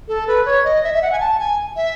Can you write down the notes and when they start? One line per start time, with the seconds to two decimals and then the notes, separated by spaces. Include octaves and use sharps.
0.08 A4
0.27 B4
0.46 C#5
0.64 D#5
0.84 E5
0.94 E5
1.02 F#5
1.12 G#5
1.20 A5
1.39 G#5
1.76 E5